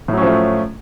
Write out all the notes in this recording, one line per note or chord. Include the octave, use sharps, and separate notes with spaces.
A2 F3 F#3 A3 C#4